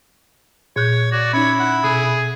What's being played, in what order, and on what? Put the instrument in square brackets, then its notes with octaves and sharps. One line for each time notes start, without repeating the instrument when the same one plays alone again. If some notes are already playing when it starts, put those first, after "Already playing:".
[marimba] A#2 F#6 G6 [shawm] C#5
[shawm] F#4 [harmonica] D5
[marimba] C#4 D#4 [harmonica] E4 B5 [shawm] C#5
[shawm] F#5
[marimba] B2 D#6 [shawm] G#4